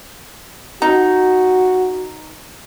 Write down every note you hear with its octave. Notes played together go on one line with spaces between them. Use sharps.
D#4 F#4